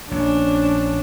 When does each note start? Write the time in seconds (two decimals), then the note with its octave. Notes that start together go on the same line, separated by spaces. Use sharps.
0.11 A#1 C#4 D4